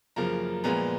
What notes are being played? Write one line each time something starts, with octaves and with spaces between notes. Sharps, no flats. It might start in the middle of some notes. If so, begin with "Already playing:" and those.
F#2 C#3 F3 A#3 A#5
A#2 F3 G#3 B3 A#5